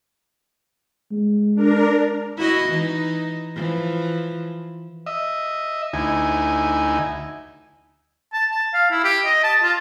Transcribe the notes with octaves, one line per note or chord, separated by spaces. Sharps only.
G#3
D4 A#4
E4 F#4 D#5
E3 D#4
E3 F3
D#5 E5
D2 D#4 E4 G#5
A5
A5
F5
E4
G4
D#5
A5
F4